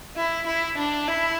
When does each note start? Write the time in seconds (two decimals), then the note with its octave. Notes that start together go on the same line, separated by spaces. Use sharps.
0.16 E4
0.47 E4
0.77 D4
1.08 E4